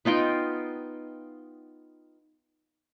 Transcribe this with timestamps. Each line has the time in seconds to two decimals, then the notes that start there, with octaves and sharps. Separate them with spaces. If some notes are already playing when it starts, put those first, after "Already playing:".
0.05 B3 D#4 F4 G5